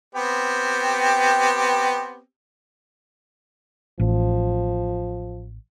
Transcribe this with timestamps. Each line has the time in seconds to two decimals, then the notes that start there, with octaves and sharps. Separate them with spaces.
0.15 B3 C4 G4
4.00 A1 F3